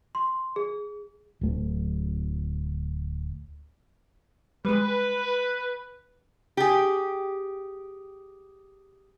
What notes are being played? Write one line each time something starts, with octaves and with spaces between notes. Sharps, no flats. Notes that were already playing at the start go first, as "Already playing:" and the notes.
C6
G#4
D1 A3
G3 G#3 B4
G4 G#4